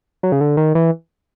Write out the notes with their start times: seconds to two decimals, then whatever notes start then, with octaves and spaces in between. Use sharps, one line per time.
0.23 F#3
0.32 C#3
0.41 D3
0.57 D#3
0.75 E3